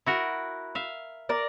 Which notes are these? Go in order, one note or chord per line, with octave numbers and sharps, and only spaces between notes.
E4 F#4 A#4
E5 F5
A#4 D5